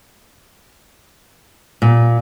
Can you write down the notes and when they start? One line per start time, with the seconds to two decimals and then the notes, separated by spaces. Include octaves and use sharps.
1.82 A#2